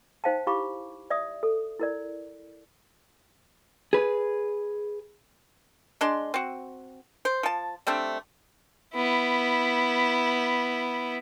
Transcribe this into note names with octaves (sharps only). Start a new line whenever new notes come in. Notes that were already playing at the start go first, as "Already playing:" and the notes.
D#4 C5 F5 G5 A5
E4 G4 F5 B5 C#6 D6
D5 E5 D#6
A4
E4 A#4 D5
G#4 B4
G#3 D4 C6
C4 F#4
C5
F3 A5
G3 A3 C4 D4
B3 E4